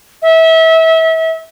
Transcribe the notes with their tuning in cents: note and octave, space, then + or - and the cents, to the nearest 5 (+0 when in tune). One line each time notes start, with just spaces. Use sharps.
E5 -30